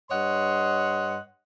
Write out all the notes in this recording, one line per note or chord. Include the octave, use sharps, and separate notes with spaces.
G2 C#5 D#5 F#5 C6